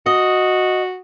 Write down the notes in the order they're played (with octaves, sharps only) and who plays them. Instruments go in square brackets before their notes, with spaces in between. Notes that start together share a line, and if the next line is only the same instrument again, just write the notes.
[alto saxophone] F#4 [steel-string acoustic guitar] D#5